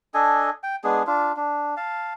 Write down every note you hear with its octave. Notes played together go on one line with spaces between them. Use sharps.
D4 A4 D#5 G#5
G5
G#3 B3 D4 G#4
D4 F4
D4
F5 A5